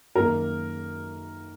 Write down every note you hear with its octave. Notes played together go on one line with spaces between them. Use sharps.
F#2 D#3 A#3 A#4